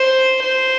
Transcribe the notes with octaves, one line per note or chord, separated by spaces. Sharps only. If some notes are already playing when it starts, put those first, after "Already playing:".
Already playing: C5
C5